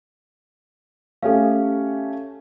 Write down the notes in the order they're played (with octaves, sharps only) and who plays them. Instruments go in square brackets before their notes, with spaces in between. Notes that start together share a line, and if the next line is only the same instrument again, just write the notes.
[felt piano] A3 C#4 G4 [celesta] A4 F5